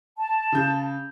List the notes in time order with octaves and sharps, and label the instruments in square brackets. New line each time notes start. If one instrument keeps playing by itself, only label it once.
[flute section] A5
[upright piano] C#3 G6